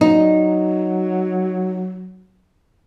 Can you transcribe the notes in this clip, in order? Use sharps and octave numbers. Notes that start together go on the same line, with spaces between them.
F#3 D#4